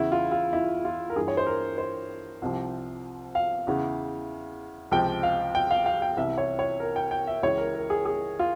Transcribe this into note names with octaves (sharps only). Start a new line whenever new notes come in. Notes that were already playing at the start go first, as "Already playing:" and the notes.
Already playing: E2 C#3 E3 E4
F4
F4
E4
F4
A#4
G2 E3 G#4
C#5
C5
A#4
C5
C2 C3 F3
F5
E2 C#3 E3
C#2 C3 F3 G5
F5
G5
F5
F5
G5
C2 C3 E3 E5
C#5
C#5
A#4
G5
G5
E5
C#2 C#3 E3 C#5
A#4
A#4
G#4
G#4
F4